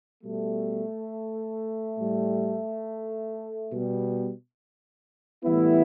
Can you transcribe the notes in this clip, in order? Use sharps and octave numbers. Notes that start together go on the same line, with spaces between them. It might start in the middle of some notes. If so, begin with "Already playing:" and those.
B2 G3 A3
A2 G3
B2 G3
A2 E3 G3 B3 E4